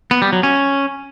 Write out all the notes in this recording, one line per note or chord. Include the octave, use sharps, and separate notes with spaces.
B3
G3
F#3
C#4